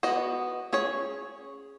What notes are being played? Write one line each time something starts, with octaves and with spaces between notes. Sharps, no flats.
B3 F#4 D#5
C#4 G#4 C#5